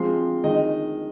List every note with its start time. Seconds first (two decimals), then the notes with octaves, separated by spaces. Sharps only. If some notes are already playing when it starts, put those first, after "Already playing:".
Already playing: F3 G#3 C4 F4 C6
0.44 D#3 G#3 D#4 D#5